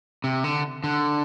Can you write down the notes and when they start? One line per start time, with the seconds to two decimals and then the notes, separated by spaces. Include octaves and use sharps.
0.24 C3
0.44 D3
0.84 D3